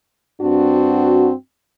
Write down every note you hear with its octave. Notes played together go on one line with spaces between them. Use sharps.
G2 C4 D4 F#4